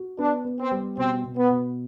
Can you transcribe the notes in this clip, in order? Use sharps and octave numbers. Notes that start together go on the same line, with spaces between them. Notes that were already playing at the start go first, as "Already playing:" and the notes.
Already playing: F#4
B3 D4
B3
C4
G3
B2 C4
B2
B3
B2